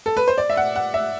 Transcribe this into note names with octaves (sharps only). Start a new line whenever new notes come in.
A4
B4
C5
D5
E5
F#5
F#5
E5